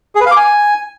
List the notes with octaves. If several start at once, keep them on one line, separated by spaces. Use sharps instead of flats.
G#4
B4
F5
D6
G#5